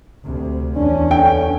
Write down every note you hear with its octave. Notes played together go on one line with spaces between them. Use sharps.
D2 C3
E2 C#4 D4
D3 G5